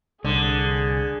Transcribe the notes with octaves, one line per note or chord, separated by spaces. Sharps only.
C2 D3 G#4